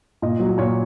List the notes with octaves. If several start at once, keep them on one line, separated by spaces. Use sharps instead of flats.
A#2 D#5
F#3
A#2 C#5